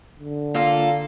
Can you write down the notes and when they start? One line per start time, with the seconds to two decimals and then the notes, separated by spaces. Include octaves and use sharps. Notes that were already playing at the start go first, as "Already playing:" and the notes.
0.20 D3
0.54 A#3 F4 A4